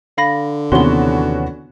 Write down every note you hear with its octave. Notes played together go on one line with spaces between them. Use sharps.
D3 F5 B5 A#6
D#2 C3 E3 B3 C#4 F#4 C6 G7